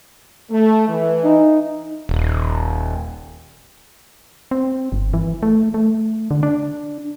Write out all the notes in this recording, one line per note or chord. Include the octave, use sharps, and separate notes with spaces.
A3
E3
D#4
D#1
C4
G1
E3
A3
A3
D3
D4